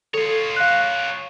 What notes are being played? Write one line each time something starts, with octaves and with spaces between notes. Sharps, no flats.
F4 A4 C#5
F5 F#6